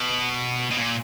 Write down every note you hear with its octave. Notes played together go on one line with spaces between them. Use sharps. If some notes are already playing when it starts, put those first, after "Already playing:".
Already playing: B2
B2
A#2